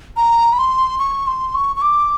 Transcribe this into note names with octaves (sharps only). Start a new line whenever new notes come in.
A#5
B5
C6
C#6
C6
C#6
C#6
D6